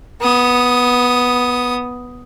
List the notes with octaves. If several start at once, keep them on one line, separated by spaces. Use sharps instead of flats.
B3 D#6